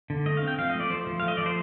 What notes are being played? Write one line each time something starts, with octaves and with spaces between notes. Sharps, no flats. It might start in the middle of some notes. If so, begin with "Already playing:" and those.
D3
A3 D#5
F5
C4
G5
F3 F5
D#5
A3
D5
F3 C5
F3
A3 F5
D#5
F3 D5
C5